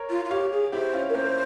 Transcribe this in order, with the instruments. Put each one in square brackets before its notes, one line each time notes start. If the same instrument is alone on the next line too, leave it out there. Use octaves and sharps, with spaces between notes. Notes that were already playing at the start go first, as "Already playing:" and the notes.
Already playing: [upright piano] A#4 C#5
[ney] F4
F4
[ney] G4 [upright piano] C#5 F5
[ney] G#4
[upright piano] E4 G4 [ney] C5
[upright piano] C#4 F4
[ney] A#4
[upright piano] A#3 C#4 [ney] C5